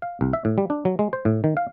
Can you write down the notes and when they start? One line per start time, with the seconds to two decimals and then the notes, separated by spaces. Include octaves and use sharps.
0.02 F5
0.21 C2
0.33 E5
0.45 A2
0.58 G3
0.70 D4
0.85 F#3
0.99 G#3
1.13 C5
1.25 A2
1.44 D#3
1.57 F5